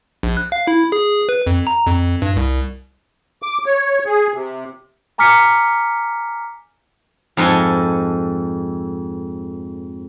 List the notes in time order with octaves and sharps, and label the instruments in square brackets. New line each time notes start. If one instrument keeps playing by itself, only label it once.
[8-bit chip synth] A#1
F#6
F5
E4
G#4
B4
F2
A#5
F2
G2
C2
[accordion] D6
C#5
G#4
C3
[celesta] G#5 A#5 D6 F6 B6 C#7
[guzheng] F2 G#2 A4 D#5 G#5